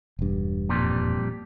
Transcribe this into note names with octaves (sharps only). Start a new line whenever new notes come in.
E1 G2
F2 A#2 G3